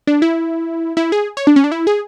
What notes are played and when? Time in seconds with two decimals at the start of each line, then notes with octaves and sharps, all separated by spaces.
0.07 D4
0.22 E4
0.97 E4
1.12 G#4
1.37 C#5
1.47 D4
1.56 C#4
1.64 D4
1.72 E4
1.87 G#4